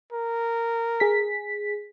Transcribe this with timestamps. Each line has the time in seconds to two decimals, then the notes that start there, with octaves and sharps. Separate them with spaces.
0.13 A#4
1.00 G#4 B6